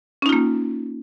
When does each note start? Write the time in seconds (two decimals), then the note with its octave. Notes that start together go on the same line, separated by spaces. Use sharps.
0.22 C#4
0.26 D#4
0.29 F4
0.32 A#3